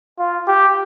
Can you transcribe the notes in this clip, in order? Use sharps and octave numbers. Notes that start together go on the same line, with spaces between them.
F4
G4